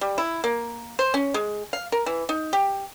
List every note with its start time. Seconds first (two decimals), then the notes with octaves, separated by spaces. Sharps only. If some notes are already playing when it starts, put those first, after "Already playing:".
0.01 G3
0.18 E4
0.44 A#3
0.99 C5
1.14 C#4
1.34 G#3
1.73 F5
1.92 A#4
2.06 E3
2.29 D#4
2.53 G4